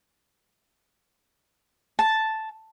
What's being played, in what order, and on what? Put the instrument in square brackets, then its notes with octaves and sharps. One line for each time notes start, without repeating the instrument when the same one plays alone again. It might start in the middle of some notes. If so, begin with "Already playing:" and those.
[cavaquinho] A5